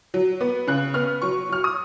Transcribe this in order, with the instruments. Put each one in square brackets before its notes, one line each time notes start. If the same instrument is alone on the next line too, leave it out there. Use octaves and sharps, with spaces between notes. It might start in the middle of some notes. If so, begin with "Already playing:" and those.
[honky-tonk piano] F#3
B3
C#3 F#6
B3 F6
F#3 C#6
F#3 F6
D#6